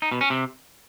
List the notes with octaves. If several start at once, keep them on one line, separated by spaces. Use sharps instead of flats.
D#4
B2
C#4
C3